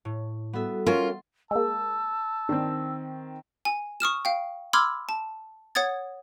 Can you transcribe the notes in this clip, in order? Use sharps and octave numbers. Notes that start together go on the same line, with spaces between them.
A2
G3 B3 F#4 A4 E5
C#4 F4 A#4 C6 A6
G#3 A#3 A5 E6
D#3 C4 D4
G#5
C#6 D#6 F6 E7
F5 G5
B5 C6 D6 E6 F6 G#6
A5
C#5 F#5 D#6 G#6 A6